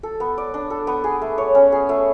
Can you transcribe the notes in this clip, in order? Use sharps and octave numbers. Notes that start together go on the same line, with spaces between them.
A4
B3
D5
D4
A4
B3
G#4
A3
C#5
C#4
G#4
A3